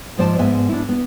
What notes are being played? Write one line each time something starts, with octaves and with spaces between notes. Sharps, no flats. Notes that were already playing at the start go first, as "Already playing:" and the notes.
G#2 F3 C5 D5 A5
G#2 B3 E5 G#5
D4 E4
B3